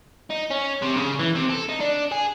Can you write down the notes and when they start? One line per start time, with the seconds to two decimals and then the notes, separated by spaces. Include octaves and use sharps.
0.30 D#4
0.50 C#4
0.82 C3
0.96 C#3
1.19 E3
1.35 C3
1.50 A4
1.69 D#4
1.81 D4
2.12 G#4